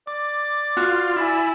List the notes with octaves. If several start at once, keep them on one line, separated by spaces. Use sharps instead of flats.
D5 D6
F4 F#4
E4 G#5 B5 A6